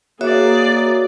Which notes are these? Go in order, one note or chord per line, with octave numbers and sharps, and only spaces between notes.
A#3 F#4 G#4 C#5 D5 E5